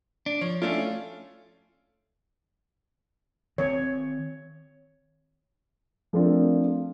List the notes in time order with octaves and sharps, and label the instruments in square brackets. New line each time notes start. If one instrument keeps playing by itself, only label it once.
[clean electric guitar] D4
[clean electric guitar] F3 [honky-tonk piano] C#5
[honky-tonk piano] A3 C#4 F4 [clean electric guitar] D4
[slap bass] D#3 C4 [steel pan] C#5
[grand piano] F3 A3 C4 D4 F4 A#4